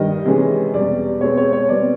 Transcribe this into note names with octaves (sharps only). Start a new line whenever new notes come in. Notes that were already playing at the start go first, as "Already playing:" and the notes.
Already playing: G2 D#3 G3 D#5
C3 E3 G#3 C#4
E2 B2 G3 D5
B2 G#3 C4 C#5
C#5
C#5
B2 G3 C4 D5